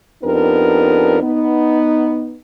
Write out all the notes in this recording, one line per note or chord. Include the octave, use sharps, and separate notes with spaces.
F2 B3 D4 D#4 G4 A#4
B3 D#4